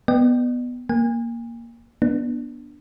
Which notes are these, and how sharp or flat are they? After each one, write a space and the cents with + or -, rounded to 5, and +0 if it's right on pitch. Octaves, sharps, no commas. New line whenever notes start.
B3 +0 D5 +45 G5 +0
A#3 +0 G#5 -40
B3 -25 D4 +0